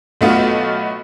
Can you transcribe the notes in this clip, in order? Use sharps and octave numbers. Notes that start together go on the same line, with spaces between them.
B1 A3 B3 F4